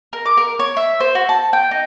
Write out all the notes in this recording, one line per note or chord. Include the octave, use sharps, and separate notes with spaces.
A#4
D6
A#4
C#5
E5
C5
F#4
A5
G5
D#4